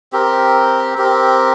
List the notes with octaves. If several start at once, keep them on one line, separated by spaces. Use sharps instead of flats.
C4 G4 A#4
C4 G4 A#4